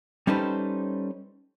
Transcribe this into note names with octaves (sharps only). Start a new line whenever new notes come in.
G3 C#4 D#4 A4 B4 C5